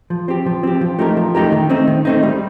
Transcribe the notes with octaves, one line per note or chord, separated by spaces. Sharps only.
F3
C4 G4
F3
C4 G4
F3
A3 D#4 G4 A#4
F3
A3 D#4 G4 A#4
D#3
A3 C4 D#4
D#3
A3 C4 D#4
G3